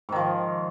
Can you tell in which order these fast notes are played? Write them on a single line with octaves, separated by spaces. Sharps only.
G#2 D#3 F3